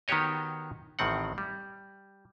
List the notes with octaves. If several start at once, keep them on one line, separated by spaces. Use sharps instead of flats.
D#3 B3 F#4 G4 C#5 D#5
A1 A2 D#3 C4 F#5
G3